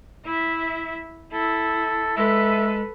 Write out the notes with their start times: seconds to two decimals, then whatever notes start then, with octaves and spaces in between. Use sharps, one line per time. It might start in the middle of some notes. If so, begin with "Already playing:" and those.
0.26 E4 E5
1.33 E4 A4
2.17 G#3 A4 B4 E5